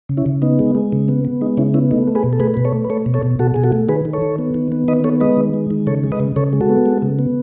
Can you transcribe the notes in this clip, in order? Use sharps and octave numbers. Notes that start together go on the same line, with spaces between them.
C#3
C#4 E4
C#3
B3 D#4
G#3
G#3
C#3
B3
B3
G#3 D#4
C#3 C#4 E4
B3 C#4 E4
A3 D#4
A3
G#4 B4
B2
A4
A3 G#4 B4
B2 B4
A4 C#5
A3
B4
A3 A4 C#5
B2
A4 C#5
B2
B2 F#4 A4
B2 G#4
F#4 A4
A3
D#3 G#4 B4
D#3
A4 C#5
D#3
B3
D#3
B3
D#3 B4 D#5
B3 A4 C#5
G#3 B4 D#5
D#3
G#3
D#3
C#3 A4 C#5
G#3
B4 D#5
C#3
C#3 A4 C#5
G#3
F#4 A4
B3
G#3
C#3
B3